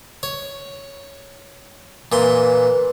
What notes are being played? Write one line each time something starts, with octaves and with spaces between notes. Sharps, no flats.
C#5
A#2 E3 C6